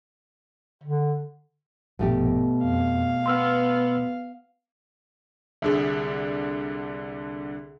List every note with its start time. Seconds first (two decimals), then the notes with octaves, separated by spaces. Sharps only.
0.84 D3
1.99 A#1 G2 B2 F3 A3 G4
2.63 F2 F5
3.26 B3 C6 E6 F6
5.62 C2 D3 D4 G#4 E5